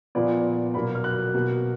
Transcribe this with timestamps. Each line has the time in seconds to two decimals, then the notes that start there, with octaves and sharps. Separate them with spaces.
0.15 A#2 F3 B3 D5
0.74 B2 F#3 A#3 B5
0.95 F6
1.04 F#6
1.34 B2 A#3